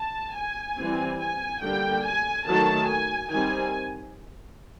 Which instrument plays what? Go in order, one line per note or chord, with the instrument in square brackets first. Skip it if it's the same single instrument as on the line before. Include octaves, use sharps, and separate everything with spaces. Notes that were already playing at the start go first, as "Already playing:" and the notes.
Already playing: [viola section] A5
G#5
E3 G3 C4
G#5
D3 G3 A#3 G5
G#5
D#3 F#3 A3 A5
G#5
D#3 G3 C4 G#5